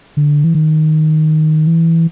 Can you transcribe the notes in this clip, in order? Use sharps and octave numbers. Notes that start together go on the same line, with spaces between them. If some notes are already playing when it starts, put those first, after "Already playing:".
D3
E3
D#3
E3